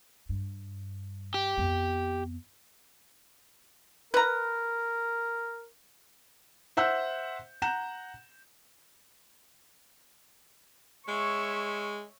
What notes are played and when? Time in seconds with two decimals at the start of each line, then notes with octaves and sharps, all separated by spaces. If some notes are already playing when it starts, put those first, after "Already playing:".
0.29 G2
1.34 G4
1.58 F2 B3
4.14 A#4 B4 A#5
6.77 C5 E5 F#5 E6 G6
7.62 F#5 A#5 G6 E7
11.08 G#3 C#5 E5 C#6